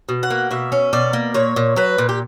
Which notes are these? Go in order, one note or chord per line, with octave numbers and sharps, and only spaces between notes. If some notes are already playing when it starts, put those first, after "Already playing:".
B2
F#5
A#3
B2 E5
C#4
B2 D5
A#3
A#2 C#5
A#2
F#3 B4
A#2
G4